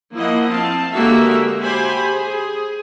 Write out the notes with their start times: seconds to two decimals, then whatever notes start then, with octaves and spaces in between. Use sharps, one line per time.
0.14 F3 A#3 E4 D#5 F#5
0.49 C4 F5 A5
0.94 D3 G#3 A#3 F#4 G4 E5
1.61 G4 C5 G#5 B5
2.12 G#4